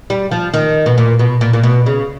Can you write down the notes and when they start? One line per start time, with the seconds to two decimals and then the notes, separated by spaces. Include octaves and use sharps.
0.10 G3
0.31 F3
0.54 D#3
0.86 B2
0.98 A#2
1.19 B2
1.41 A#2
1.53 A#2
1.64 B2
1.86 C#3